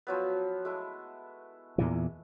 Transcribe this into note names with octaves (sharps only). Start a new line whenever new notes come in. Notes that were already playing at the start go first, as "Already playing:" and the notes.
F3 F#3 B3
G#3 A3 E4
E2 A#2 E3